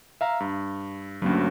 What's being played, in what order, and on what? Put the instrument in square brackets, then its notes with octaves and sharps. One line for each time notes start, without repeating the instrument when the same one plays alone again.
[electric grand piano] E5 F5 A#5
G2
[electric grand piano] D2 G2 [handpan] F#3 A#3 C#4